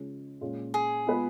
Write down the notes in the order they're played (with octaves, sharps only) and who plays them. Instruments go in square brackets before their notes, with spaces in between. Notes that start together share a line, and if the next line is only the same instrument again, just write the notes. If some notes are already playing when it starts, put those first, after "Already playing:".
Already playing: [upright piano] C#3 F3 G#3 C#4
A#2 G#3 C#4 F4
[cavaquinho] G#4
[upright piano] F3 G#3 B3 F4 B4